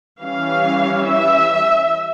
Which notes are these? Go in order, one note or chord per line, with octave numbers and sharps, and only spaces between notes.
E3 G3 C#4 F5
E5